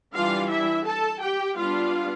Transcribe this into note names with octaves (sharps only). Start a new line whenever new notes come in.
E3 G3 D4 F4 F5
E4 E5
A4 A5
G4 G5
G3 B3 D4 F4 F5